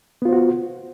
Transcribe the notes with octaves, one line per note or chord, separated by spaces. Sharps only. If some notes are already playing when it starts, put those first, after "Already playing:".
B3 F4 F#4 C5